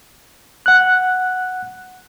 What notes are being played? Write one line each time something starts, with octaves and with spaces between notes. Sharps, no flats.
F#5 F#6